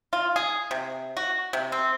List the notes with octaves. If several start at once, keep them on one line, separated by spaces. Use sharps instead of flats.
F4
G#4
C3
F#4
C3
C4